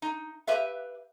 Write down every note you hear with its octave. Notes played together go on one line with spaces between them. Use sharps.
D#4
G4 B4 E5 F5